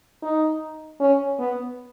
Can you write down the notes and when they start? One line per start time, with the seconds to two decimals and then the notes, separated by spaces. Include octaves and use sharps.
0.23 D#4
1.00 C#4
1.39 B3